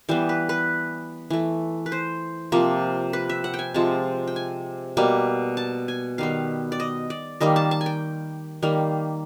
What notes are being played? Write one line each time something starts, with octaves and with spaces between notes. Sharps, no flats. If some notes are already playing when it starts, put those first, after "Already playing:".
E3 G3 B3 C5
B4
B4
E3 A3
B4
C5
C3 F3 A#3
B4
E5
F#5
G5
G#5
C3 F3 G#3 A5
G5
G#5
B2 G3 A#3
A5
G#5
D#3 G3 B3 F5
D5
D#5
D5
D#3 G3 A#3 D#5
A5
A5
G#5
G5
D#3 G3 A#3